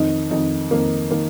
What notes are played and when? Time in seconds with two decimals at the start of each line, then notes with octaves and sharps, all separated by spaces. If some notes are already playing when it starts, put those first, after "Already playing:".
Already playing: F2 D#3 D#4
0.31 F2 D#3 D#4
0.71 F2 D#3 A#3
1.11 D#3 A#3